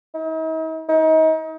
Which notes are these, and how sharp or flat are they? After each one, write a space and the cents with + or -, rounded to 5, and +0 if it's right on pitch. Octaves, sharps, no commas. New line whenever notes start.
D#4 +45
D#4 +30